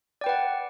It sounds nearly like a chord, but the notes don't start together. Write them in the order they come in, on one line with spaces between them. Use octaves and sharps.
D5 G5 B4 F#5